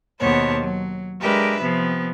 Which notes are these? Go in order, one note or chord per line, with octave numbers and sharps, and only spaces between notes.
D#2 B2 B3 C5 C#5 A5
F#3
G#3 D4 G4 A#4 B4 E5
C3 F3 B3 C4